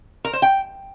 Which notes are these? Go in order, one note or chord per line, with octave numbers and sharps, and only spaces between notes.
A#4
C5
G5